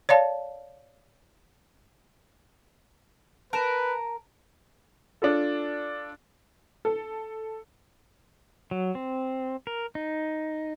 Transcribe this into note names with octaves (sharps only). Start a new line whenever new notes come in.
C#5 D5 F5 A5
A#4 B4 A5 A#6 E7
D4 F4 A4
A4
F#3
C4
A#4
D#4